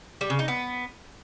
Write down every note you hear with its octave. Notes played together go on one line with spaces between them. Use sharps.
G3
C#3
D#4
B3